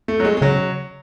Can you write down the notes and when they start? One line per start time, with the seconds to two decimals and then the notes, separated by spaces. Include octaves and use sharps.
0.08 A3
0.20 F#3
0.25 G#3
0.37 G#3
0.42 C#3 F#3